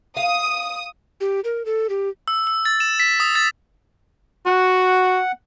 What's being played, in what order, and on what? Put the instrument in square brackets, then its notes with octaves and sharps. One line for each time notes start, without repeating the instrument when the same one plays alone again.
[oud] F5 [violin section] D#6
[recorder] G4
A#4
A4
G4
[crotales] E6
E6
A6
E7
B6
D#6
A6
[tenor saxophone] F#4 [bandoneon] F#5